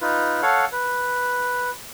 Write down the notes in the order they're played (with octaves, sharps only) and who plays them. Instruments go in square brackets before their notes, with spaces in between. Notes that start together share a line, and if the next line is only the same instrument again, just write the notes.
[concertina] D#4 F4 B4
A4 C#5 F5 F#5
B4